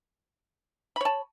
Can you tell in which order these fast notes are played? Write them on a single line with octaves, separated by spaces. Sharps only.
B5 C#5 A5